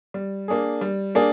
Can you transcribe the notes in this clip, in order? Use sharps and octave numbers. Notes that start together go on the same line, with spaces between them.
G3
A#3 D4 G#4
G3
A#3 D4 G#4